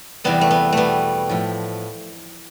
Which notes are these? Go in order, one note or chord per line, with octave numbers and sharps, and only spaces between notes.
E2 C3 G3 B3
A3
B3
B2 G3 A3 B3
A2 F3